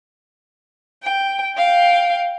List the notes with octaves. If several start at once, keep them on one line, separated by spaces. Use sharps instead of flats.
G5
F5 G5